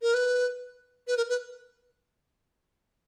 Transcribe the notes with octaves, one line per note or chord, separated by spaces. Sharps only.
A#4
B4
B4
A#4
B4